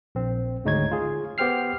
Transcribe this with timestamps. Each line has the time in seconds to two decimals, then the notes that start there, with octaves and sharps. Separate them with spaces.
0.15 A#1 C4
0.64 G#1 D2 G#3 D#4 C#5 G#6
0.92 F4 G#4
1.38 B3 G4 C5 G5 F6 C7